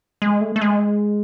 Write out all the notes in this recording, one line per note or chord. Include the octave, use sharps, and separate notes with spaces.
G#3
A3
A3
G#3